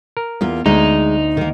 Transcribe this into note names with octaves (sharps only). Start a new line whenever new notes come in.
A#4
E2 A#3 F4
D2 G#3 D#4
D#3 A#3